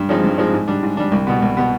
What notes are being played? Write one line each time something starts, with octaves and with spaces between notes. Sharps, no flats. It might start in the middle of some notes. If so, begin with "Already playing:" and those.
Already playing: G2
F3 G#3 C4 D#4
G2
F3 G#3 C4 D#4
G#2
G3 D4
G#2
G3 D4
C2
B2 B3
C2
B2 B3